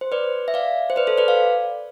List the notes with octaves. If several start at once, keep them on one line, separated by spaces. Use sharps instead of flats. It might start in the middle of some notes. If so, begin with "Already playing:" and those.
C5
B4 D5
E5
D5 F5
C5
B4 D5
A4 C5
B4 D5
D5 F5